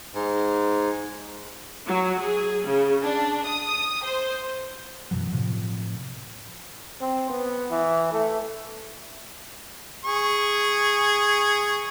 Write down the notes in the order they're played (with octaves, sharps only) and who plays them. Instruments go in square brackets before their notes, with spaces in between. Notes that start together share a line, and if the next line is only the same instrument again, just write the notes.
[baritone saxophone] G#2
[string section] F#3
G#4
C#3
D4
D#6
C5
[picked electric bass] F#2 B2 E3 F#3
A2 C3 F3
[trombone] C4
B3
E3
A3
[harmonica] G#4 C#6